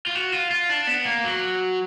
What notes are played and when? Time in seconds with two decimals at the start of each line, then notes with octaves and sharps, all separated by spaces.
0.07 F4
0.15 F#4
0.33 F4
0.51 F4
0.70 D4
0.87 B3
1.05 A#3
1.24 F#3